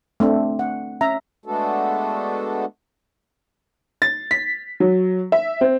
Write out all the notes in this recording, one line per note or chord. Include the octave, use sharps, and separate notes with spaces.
A3 C4 D4 D5
F#5
C#4 E5 A#5
G#3 A3 B3 D4 F#4 A4
A6
B6
F#3
E5
C4